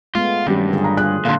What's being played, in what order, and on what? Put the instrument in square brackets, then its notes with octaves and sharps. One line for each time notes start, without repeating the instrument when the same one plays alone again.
[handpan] G#3 A3 B3 [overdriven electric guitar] F4
[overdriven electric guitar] G2 [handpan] D#3 F#3 [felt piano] C#4 G4
[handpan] D3 F4 G#4
[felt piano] A#5
[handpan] F4 G#4 [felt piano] F#6
[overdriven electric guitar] A#2 D3 [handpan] A4 [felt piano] F5 C6